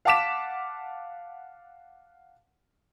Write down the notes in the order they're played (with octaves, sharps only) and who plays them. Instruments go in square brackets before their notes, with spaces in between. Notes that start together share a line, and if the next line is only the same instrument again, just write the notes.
[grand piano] F5 F#5 A5 D6 B6 E7